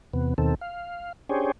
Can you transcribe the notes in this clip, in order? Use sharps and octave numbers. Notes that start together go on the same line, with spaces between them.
E2 C3 B3
D#2 B2 D#3 C4 A4
F5
C#4 D4 G4 G#4 C5 C#5